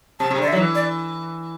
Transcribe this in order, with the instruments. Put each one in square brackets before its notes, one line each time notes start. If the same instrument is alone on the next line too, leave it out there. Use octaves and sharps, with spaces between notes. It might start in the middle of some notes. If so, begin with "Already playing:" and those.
[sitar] C3 [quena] A5
[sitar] C3
[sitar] D3 [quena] D5
[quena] E5
[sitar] F#3
E3
[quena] D5